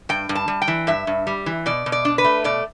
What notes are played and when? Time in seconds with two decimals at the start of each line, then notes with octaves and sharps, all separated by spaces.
0.09 G2 G5
0.29 G2
0.35 A5
0.48 G3
0.62 G5
0.68 E3
0.87 G2 E5
1.07 G2
1.27 G3
1.46 E3
1.66 B2 D5
1.86 B2
1.92 D5
2.05 D4
2.18 B4
2.24 A3
2.44 B2 D5